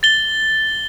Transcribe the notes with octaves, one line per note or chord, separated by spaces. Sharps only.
A6 G7